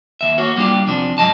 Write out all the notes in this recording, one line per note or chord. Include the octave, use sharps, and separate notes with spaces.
D#2 E5
A#3 F#4 C#5
G3 A#3 D4 F4 G4
E2 C3 F3 D4
G#2 F#3 D#5 A5